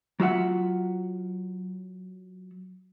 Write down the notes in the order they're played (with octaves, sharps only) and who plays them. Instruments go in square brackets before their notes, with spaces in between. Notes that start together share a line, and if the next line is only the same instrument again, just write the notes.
[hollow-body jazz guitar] F#3 F4 E5 F#5